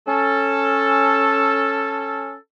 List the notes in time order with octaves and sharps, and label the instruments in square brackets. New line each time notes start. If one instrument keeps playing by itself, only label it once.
[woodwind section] C#4 A4